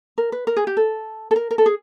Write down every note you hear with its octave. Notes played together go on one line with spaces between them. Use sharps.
A#4
B4
A#4
G#4
G4
A4
A4
A#4
A#4
A4
G#4